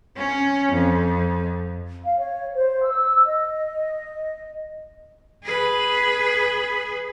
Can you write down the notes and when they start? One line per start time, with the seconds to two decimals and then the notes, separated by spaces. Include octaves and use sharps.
0.17 C#4
0.72 F2
2.05 F5
2.19 C#5
2.54 C5
2.84 E6
3.25 D#5
5.44 G#4 B4